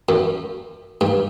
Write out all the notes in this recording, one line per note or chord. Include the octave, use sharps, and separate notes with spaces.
F#2
G2